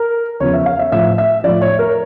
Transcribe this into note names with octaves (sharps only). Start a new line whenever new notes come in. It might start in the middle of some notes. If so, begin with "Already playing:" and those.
Already playing: A#4
E2 C#3 F3 C#5
E5
F5
E5
A2 F3 E5
E5
A2 F3 D5
C#5
A#4